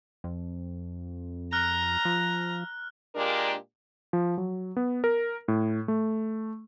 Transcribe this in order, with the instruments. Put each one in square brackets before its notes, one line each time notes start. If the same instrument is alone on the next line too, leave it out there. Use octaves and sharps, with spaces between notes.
[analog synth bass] F2
[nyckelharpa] A#5 [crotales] F6 F#6
[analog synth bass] F3
[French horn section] A#2 G#3 A#3 D4 G4 A#4
[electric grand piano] F3
F#3
B3
A#4
A2
A3